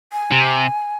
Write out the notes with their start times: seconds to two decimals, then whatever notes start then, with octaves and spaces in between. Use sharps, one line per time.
0.12 G#5
0.32 C3